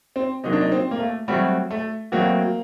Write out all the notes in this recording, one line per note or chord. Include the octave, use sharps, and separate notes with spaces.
C4
C3 F#3 A#3 D#4
D4
D#4
C4
A#3
A3
F#3 G3 A3 C4 F#4
A3
F#3 A3 A#3 C4 F#4